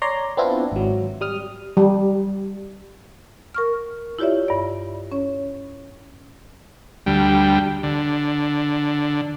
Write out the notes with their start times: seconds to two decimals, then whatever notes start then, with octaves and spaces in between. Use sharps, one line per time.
0.02 C#5 D5 A#5 C6
0.37 B3 C4 D4 E4 F4
0.72 G#1 F#3
1.21 G3 D#6 F6
1.77 G3
3.55 A#4 C#6 F6
4.19 E4 F4 G4 C#5 D5 E5
4.48 G2 D5
5.12 C#4 C#5
7.06 D2 G3
7.83 D3